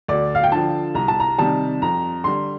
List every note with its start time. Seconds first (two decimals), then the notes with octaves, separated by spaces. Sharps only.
0.08 D2 D5
0.35 F5
0.43 G5
0.52 D3 F3 A5
0.95 C2 A#5
1.08 A5
1.20 A#5
1.38 C3 D#3 G3 A5
1.82 F2 A#5
2.24 D3 G3 C6